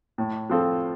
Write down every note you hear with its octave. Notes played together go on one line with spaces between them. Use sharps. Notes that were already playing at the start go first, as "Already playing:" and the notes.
A2
F3 C4 F4 A4